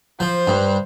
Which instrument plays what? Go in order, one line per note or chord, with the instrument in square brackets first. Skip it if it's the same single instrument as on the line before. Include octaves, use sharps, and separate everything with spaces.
[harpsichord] F3 [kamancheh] C5
[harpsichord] G2